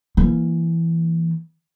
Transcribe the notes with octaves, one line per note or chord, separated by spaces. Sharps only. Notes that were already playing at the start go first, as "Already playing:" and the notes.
E3 A#3